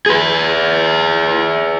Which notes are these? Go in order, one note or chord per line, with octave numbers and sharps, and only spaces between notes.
G#4 B4